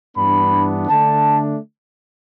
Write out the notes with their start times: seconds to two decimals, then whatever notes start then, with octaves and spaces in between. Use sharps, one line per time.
0.16 G2 E3 B3 D4 B5
0.88 D3 A3 D4 A5